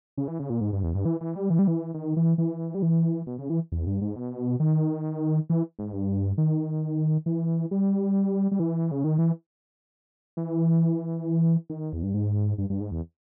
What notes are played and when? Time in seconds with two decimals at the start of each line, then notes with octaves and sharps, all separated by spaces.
0.17 C#3
0.28 E3
0.39 C#3
0.50 A#2
0.61 G#2
0.73 G2
0.83 E2
0.95 G2
1.05 E3
1.21 E3
1.36 G3
1.50 E3
1.59 G3
1.67 E3
1.94 D#3
2.16 E3
2.38 E3
2.75 G3
2.82 E3
3.27 B2
3.39 C#3
3.50 E3
3.72 E2
3.87 G2
4.01 G#2
4.16 B2
4.60 D#3
5.50 E3
5.79 G#2
5.93 G2
6.38 D#3
7.26 E3
7.71 G3
8.51 G3
8.60 E3
8.91 C#3
9.04 D#3
9.18 E3
10.37 E3
11.70 D#3
11.93 E2
12.03 G2
12.14 G#2
12.58 G2
12.70 G2
12.80 G#2
12.91 E2